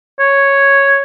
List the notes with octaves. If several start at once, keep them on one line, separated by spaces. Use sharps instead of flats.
C#5